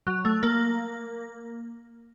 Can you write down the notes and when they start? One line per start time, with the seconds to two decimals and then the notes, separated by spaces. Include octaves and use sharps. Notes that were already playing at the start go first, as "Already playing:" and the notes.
0.07 F#3
0.25 A3
0.43 A#3